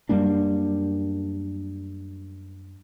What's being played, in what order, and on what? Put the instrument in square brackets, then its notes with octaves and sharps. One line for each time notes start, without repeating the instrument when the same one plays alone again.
[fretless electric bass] F#2 G3 A#3 D4